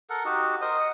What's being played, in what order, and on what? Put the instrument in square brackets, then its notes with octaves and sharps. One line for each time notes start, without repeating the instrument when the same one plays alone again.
[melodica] A4 A#4 F#5
D#4 F#4 G4
[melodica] A#4 C5 [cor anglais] D#5
[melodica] F#5